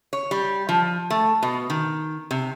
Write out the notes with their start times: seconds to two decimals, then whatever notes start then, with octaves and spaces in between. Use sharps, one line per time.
0.13 C#5
0.31 G3
0.69 F3
1.10 A3
1.43 B2
1.70 D#3
2.31 C3